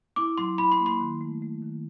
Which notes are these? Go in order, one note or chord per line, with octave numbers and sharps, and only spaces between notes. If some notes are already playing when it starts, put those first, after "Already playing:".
E4 D6
F#3 C6
E4 B5
C6
A#3
C6
D#3
A3
A3
D#3